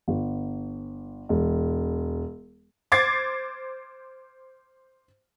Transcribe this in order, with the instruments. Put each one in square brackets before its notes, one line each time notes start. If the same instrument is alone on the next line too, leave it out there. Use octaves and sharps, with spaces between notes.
[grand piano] G1
E1
[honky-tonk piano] C5 D6 G#6 A6 C7